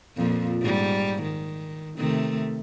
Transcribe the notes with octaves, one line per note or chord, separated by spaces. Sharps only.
F2 A#2 F3
G#2 G3
D#3
C3 D#3 A3